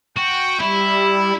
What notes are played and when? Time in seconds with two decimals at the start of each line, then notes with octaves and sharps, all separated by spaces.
0.17 F#4 G5
0.60 G3 E4